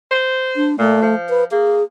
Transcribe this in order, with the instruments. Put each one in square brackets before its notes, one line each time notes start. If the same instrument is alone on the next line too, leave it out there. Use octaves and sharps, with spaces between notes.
[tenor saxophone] C5
[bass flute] D4
[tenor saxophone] A#2 [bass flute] A3
[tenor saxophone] F3
[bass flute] B4
[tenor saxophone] A#3 [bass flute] G#4